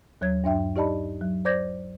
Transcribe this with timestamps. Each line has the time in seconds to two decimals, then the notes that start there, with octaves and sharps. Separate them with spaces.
0.21 D#2 F#3 C#5 G#6
0.44 G2 D4 E5 G5
0.76 D#4 G4 D5 D#5 A5 B5
1.21 F#3
1.45 C5 D5 D6 G6 G#6 A#6